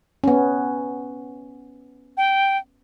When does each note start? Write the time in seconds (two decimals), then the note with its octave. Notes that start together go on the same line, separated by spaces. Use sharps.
0.24 B3 C#4
2.17 G5